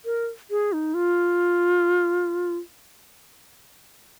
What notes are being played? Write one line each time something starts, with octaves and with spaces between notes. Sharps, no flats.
A#4
G#4
D#4
F4